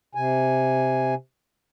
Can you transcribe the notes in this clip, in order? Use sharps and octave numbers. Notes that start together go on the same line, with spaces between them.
C3 G#5